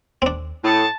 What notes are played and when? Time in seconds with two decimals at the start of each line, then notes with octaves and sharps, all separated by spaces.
0.22 D#2 C4 D4
0.64 A2 E4 A5 D#6 C#7